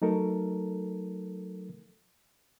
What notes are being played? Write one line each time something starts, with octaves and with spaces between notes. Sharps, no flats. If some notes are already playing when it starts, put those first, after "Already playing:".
F#3 A3 D#4 A4 A#4